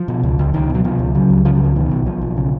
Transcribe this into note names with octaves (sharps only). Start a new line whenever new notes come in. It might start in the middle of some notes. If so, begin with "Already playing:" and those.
Already playing: F3
B2
C#2
C#2
C#2 D#3
B2 F#3
B2 F3
C#2
C#3 F#3
C#2
C#3 F3
F#3
C#2 F3
B2 D#3
B1
B1 F3
B1
C#3